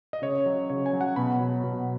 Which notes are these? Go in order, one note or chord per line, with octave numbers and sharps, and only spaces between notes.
D#5
C#3 C#5
F#3
C#3 C#5
G#5
F#3
F#5
B2 B5
F#3
B2